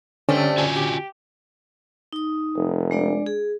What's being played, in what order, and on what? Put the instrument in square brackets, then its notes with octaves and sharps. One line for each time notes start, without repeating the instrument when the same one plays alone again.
[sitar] G2 A3 C4 [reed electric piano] D3 C#4
[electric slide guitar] F4 F#4 G#5
[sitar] G4
[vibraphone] D#4 D#6
[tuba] F1
[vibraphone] G#3 D4 D5
G#4